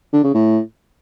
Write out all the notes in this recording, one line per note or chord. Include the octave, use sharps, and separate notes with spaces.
D3
C#3
A2